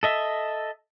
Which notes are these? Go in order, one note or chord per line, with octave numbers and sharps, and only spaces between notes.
A4 D#5 E5